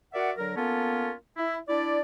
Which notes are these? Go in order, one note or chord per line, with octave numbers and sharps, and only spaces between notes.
F#4 A#4 D5 E5 F#5
D3 F#3 A#4
A#3 B3 C#4 F4 A4
E4
D4 E4 D5